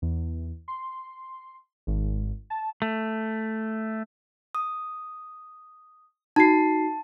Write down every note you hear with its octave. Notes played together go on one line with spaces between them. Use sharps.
E2
C6
G#1
A5
A3
D#6
D#4 F#4 A5 C7